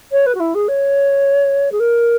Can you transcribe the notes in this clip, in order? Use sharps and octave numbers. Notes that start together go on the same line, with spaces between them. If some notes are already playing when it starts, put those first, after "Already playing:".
C#5
B4
F#4
E4
G#4
C#5
G#4
A#4